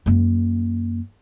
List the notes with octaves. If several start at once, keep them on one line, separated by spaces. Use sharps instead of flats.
F#2 A#3